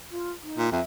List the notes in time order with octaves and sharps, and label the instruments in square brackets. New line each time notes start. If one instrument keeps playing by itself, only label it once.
[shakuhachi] F4
D#4
[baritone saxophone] A#2
[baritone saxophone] F2 [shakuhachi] E5